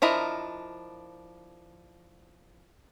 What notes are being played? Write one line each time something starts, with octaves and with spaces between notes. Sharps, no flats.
F3 D4 E4 A#4 D#5